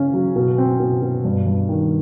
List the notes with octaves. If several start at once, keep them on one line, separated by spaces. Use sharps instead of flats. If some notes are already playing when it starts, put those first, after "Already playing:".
Already playing: C#3 C#4
F#3
B2
C4
B2
B2
G2
G2
D#3